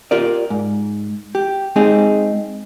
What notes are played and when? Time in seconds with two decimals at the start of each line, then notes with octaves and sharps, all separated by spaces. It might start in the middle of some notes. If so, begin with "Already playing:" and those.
0.11 F4 G4 A#4 D5
0.50 G#2
1.35 G4
1.76 G#3 C4 D#4 G4 G#4